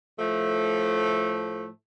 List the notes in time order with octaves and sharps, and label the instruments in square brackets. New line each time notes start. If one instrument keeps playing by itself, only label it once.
[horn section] A2 F3 A3